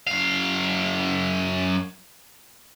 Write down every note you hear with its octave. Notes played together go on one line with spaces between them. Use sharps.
F#2 F5